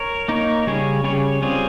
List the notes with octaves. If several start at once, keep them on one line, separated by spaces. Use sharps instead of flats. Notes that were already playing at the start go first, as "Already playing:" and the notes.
Already playing: A#4 C#5
A#3 D#4 A#4 C#5
C#3 G3 C#4 G#4 C#5
C#3 G3 C#4 G#4 C#5
G3 C4 F4 G#4 C#5